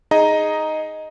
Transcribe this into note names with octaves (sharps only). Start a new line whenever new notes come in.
D#4 G#4 D#5 A#5